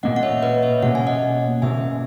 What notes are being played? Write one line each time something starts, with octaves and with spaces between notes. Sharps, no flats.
A#2 A#3 C#4 D#5 F#5
F#5
C#5 E5
B4 D#5
C#5 E5
B2 A#3 C#4 F#5
G#5
D#5 F#5
B2 A#3 C#4 E5 G#5